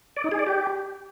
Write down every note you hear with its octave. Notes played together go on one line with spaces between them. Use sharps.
D5
D#4
G#4
D5
G4